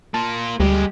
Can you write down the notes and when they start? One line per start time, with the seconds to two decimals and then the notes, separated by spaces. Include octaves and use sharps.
0.14 A#3 F4 A5
0.60 D2 G3 G#3 G4